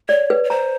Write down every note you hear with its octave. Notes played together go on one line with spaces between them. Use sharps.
C#5 D5
B4
C#5
C5 A#5